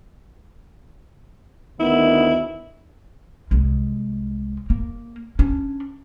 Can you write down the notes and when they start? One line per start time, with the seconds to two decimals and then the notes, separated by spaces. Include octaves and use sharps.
1.80 D2 D#3 B3 E4
3.51 C2 G#3
4.70 A#3
5.39 C#4 D4